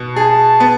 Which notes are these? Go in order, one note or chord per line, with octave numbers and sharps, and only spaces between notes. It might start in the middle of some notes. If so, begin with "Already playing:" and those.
Already playing: B2
G#4 A5
B3